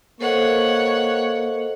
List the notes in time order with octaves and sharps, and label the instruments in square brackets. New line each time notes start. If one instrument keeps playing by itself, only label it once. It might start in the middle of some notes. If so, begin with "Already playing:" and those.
[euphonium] A#3 [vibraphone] A4 C5 D#5 [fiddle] C#5 F#5